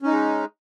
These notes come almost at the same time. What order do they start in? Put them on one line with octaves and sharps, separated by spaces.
C#4 D#4 G#3